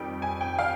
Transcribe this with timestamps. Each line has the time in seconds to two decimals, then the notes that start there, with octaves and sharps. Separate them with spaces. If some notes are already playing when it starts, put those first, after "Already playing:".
Already playing: F2 D#3 G3 G5
0.22 G#5
0.41 G5
0.59 F5